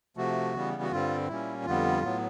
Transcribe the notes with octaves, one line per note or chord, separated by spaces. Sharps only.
C3 F3 A3 F#4
C#3 E3 G3 B3
F#4
G2 D3 G3 C4 F4
A#2 G3 A#3 C#4 E4
F2 D3 G3 B3 F4
A2 F#3 B3